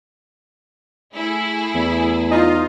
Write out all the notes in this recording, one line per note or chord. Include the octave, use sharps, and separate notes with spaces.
A3 E4 G#4
E2
D#4 F4 D#5